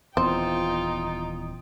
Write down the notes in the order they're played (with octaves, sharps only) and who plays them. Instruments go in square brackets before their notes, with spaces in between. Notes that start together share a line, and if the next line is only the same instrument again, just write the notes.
[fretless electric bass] D#1 E2 [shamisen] C4 [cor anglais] D#4 [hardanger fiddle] F4 G5